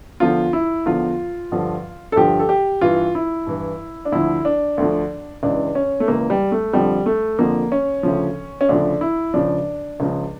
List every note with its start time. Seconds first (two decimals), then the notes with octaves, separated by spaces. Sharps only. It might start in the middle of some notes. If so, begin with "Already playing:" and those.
0.20 E2 D3 F3 F4
0.53 E4
0.86 E2 D3 F3 F4
1.52 G2 D3 F3
2.12 A4
2.16 G2 D3 F3 G4
2.39 A4
2.49 G4
2.81 G2 E3 F4
3.15 E4
3.47 G2 E3
4.05 D4
4.12 D2 D3 F3 E4
4.45 D4
4.78 D2 D3 F3
5.43 C#2 C#3 E3 D4
5.75 C#4
6.00 A3
6.08 C#2 C#3 E3 A#3
6.30 G3
6.52 A3
6.73 F2 D3 F3 G3
7.06 A3
7.39 F2 D3 F3 A#3
7.72 C#4
8.03 D2 C#3 F3
8.61 C#4
8.69 D2 C#3 F3 D4
9.01 E4
9.34 C#2 C#3 F3 D4
10.00 C#2 C#3 F3